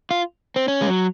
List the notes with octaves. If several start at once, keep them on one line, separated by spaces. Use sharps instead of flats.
F4
C4
C#4
G#3
F#3